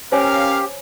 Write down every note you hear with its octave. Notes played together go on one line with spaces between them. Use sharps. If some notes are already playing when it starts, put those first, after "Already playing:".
C#4 G4 A#4 C5 C#5 F5 G#5